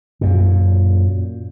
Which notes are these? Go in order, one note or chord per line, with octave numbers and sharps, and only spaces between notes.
F#2 A#2